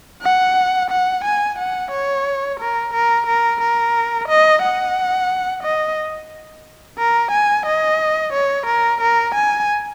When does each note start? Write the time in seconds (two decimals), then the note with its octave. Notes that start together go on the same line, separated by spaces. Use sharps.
0.22 F#5
0.90 F#5
1.24 G#5
1.58 F#5
1.91 C#5
2.60 A#4
2.94 A#4
3.27 A#4
3.61 A#4
4.28 D#5
4.62 F#5
5.63 D#5
6.98 A#4
7.31 G#5
7.66 D#5
8.33 C#5
8.67 A#4
9.01 A#4
9.35 G#5